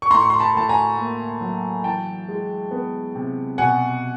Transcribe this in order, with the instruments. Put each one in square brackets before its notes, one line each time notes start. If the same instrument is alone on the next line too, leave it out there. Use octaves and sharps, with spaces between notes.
[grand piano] C#6
A2 A#5 C6
C#6
C6
A5 B5
A2 A5
G#5 A#5
A#3
F#3
E3 G5 A5
G#3
B3
C3
B2 F#5 G#5